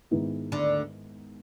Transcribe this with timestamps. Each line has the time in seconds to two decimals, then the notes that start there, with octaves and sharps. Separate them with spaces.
0.11 G#2 D#3 G#3 B3 E4
0.52 D2 D3